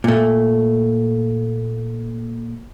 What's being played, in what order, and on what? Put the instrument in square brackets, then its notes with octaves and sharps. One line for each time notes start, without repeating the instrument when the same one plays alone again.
[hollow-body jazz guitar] A#2 A3